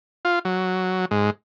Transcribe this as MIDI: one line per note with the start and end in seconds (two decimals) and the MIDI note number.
0.25 0.39 65
0.45 1.05 54
1.11 1.30 44